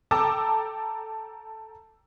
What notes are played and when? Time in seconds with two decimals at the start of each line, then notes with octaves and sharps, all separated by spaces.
0.11 A4 G5 A5 A#5 D6 E6